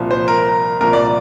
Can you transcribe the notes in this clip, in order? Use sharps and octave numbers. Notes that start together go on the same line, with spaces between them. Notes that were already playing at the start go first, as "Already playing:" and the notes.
Already playing: C2 A#2 F3
C5
A#4
C2 A#2 F3 A#4
D5